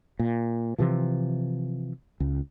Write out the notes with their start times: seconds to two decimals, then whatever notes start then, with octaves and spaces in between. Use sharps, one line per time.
0.19 A#2
0.78 C3 E3 F3
2.20 C#2